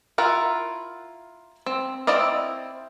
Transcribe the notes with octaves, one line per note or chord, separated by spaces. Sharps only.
E4 F4 A#4 F#5
C4
C4 E4 D5 D#5 F5